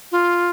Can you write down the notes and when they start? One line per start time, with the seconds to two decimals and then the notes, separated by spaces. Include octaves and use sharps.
0.12 F4